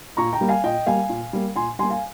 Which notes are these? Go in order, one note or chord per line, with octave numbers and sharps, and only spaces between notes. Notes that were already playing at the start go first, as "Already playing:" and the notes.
A#2 A#5 C#6
G5 A#5
G3 A#3
F5 G#5
A#2 D#5 G5
G3 A#3 F5 G#5
A#2
G3 A#3
A#2 G#5 C6
G3 A#3 G#5 C6
F5 G#5